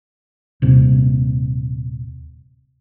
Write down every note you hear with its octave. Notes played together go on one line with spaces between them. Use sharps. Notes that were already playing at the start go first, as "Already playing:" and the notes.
D#1 C3